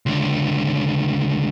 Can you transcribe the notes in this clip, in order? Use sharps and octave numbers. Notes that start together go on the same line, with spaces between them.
C#2 D3